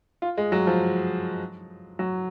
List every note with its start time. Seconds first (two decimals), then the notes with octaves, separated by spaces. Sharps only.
0.22 F4
0.37 G#3
0.52 F#3
0.67 F3
1.99 F#3